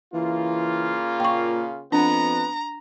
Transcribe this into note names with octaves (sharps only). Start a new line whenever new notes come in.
C#3 E3 A#3 F4
A#2 G5 C#6
F2 B3 D4 A#5